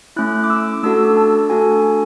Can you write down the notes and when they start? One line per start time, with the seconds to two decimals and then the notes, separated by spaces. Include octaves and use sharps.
0.16 A3 C#4 E4 F#6
0.44 D6
0.50 E6
0.83 A3 D4 F#4 A4 E6
1.17 A5
1.50 A3 D4 F#4 A4 G#5
1.72 G#5